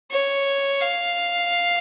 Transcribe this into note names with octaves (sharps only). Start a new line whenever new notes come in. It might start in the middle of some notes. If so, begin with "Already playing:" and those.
C#5
F5